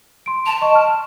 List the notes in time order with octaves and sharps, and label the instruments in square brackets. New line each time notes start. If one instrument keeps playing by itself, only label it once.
[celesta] C6 D7
[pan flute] A5 [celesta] F7
[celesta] D#5 C#6
F6